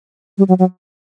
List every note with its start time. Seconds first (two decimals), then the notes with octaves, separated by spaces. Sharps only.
0.38 G3
0.48 F#3
0.59 F#3